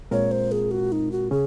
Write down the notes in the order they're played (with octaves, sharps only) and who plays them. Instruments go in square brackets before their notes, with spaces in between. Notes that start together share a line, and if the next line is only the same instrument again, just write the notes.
[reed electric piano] A#2 G#3 C4 F4 A#4 [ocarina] C#5
[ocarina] C5
G#4
F#4
D#4
F#4
[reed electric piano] C#3 C#4 [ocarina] G#4